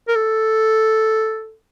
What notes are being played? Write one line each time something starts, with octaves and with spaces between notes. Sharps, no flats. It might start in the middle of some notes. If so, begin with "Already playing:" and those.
A#4
A4